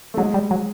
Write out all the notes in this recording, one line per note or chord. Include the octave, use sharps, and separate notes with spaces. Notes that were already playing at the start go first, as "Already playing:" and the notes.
A3
F#3 G#3
G3
F#3